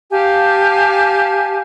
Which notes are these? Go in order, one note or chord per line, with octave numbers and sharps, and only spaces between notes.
G4 F5 G#5 A5